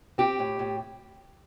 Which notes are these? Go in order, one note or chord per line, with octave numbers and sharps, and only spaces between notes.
C4 G4
A2
A2